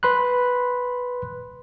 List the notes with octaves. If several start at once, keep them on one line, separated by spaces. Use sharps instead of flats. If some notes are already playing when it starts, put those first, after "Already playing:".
B4 B5 C6 F#6